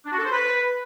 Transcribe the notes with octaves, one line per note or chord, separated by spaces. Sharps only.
D4
F#4
A4
C5
B4